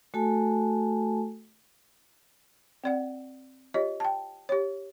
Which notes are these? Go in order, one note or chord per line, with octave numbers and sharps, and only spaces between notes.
A3 F#4 A4 G#5 A5
C4 D5 F#5
F4 G4 C#5 D#5
G5 A5
G4 C#5